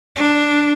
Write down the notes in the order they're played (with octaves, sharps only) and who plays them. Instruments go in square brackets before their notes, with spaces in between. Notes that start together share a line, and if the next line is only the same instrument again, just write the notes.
[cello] D4